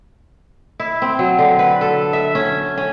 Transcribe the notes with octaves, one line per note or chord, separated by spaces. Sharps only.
E4
C4
F#3
D3
B4
A4
E5
C#4
C#4